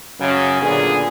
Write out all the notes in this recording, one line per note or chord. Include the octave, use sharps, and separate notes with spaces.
F#2 C#3
A#2 D3 B3 G#4